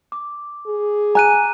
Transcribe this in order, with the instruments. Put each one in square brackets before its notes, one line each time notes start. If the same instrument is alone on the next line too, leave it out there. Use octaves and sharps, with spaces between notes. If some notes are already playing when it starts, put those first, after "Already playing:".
[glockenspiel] D6
[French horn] G#4
[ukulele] G#5 [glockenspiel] A#5 F#6 D#7